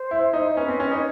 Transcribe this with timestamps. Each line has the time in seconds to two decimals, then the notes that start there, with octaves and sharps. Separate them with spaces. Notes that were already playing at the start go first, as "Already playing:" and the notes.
Already playing: C5
0.11 E4
0.33 D#4
0.57 C#4 B4
0.68 C4
0.80 C#4
0.91 D#4
0.96 C#5